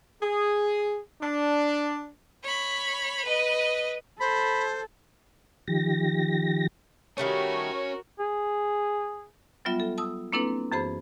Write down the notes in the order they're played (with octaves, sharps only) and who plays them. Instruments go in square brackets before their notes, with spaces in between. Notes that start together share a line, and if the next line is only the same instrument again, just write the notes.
[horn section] G#4
D4
[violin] C#5 B5
B4 D#5
[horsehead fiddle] A4 [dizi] C5 [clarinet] B5
[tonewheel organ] D#3 F3 G4 A#6
[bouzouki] D#3 G3 A3 [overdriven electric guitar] C#4 [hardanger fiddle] F#4 A#4 [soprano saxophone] C#5
[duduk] G#4
[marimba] F#3 G3 B3 F4 E5
A4
A5 D#6 E6
A#3 C4 D4 E4 A4 B4
F#2 E3 G#4 C5 B5